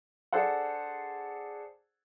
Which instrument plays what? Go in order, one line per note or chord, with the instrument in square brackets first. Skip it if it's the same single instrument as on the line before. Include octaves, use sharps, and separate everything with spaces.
[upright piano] D4 G#4 A4 C5 F#5